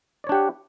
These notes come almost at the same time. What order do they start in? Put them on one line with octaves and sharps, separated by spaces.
D5 C#5 D4 G4 F#5